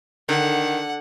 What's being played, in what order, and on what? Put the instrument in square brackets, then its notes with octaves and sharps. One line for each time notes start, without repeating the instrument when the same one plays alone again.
[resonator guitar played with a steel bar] D3 [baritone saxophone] D#3 [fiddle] F#5